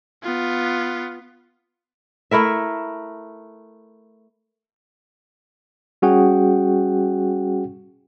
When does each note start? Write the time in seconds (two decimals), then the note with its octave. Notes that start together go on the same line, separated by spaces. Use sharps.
0.23 B3 F4
2.31 A3 E4 A#4 E5
6.02 G3 C#4 F#4 G#4 F#5 G5